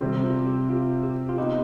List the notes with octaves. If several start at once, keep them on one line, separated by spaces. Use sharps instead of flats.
C3 G3 C4 G4
F4
G4
F4
G4
F4
B3 D#4 G4 B4 D#5